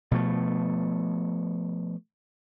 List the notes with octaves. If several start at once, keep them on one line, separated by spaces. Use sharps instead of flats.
B2 F3 A3